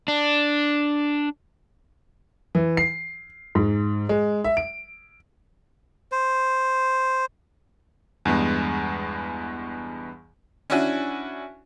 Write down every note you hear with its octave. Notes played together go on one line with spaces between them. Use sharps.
D4
E3
C7
G#2
G#3
E5
D7
C5
E2 G2 G#3 B3
C#4 D4 E4 F#4 G#5